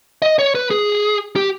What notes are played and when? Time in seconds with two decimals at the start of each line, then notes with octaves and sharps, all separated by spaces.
0.22 D#5
0.39 C#5
0.55 B4
0.70 G#4
1.36 G4